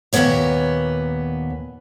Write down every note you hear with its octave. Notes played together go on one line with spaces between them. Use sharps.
D#2 A#2 F3 B3 C#5 A#5